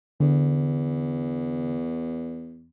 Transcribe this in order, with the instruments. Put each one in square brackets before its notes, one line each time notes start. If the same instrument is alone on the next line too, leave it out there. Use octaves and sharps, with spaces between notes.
[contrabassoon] E2 [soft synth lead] D3